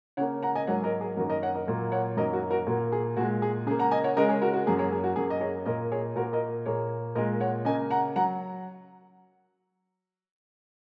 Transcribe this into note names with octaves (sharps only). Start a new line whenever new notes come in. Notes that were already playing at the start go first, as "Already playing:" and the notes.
C#3 A#3 C#5 F#5
F#5 A#5
D#5 G#5
G#2 F#3 A#3 C#5 F#5
A#4 D#5
G#4
F#2 D#3 A#3 F#4 A#4
A#4 D#5
C#5 F#5
A#4 D#5
A#2 F#3 A#3
C#5 F#5
F#2 D#3 F#3 A#3 A#4 D#5
F#4 A#4
F#4 A#4
A#2 A#3 F#4
G#4
A#2 G#3 F#4
G#4
C#3 A#3 G#4
F#5 A#5
D#5 G#5
C#5 F#5
C#3 G#3 A#4 D#5
G#4 C#5
F#4 A#4
F#4
F#2 F#3 A#3 G#4
G#4 C#5
G#4
F#4
F#2 F#3 A#3 G#4
D#5
G#4 C#5
A#2 A#3 A#4 D#5
G#4 C#5
A#2 A#3 F#4 A#4
A#4 D#5
A#2 A#3 G#4 C#5
A#2 G#3 A#4 D#5
C#5 F#5
C#3 A#3 D#5 G#5
F#5 A#5
F#3 F#5 A#5